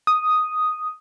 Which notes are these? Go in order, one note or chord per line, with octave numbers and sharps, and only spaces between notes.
D#6